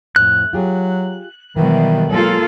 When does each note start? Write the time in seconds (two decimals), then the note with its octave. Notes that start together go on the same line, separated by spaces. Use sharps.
0.16 F2 A2 F#6
0.53 F#3 F4 G4 G#4
1.56 B2 D#3 E3 F#3 G3 E5
2.10 F#3 G#3 A#3 F4 A4